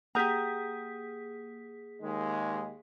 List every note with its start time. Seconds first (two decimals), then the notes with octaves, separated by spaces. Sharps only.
0.15 A#3 G4 G#4 F#5 A#5 D#6 G6 B6
2.01 D#2 D#3 G#3